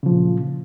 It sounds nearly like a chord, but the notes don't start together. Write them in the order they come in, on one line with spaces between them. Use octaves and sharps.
C#3 F3 A#2